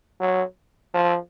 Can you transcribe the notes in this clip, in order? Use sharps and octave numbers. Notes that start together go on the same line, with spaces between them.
F#3
F3